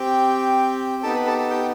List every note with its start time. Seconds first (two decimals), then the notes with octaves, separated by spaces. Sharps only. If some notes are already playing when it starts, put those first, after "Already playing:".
Already playing: C4 G4 G5
1.03 B3 D#4 G4 A4 A5
1.14 B4 B5
1.27 A4 A5
1.38 A4 A5
1.50 G4 G5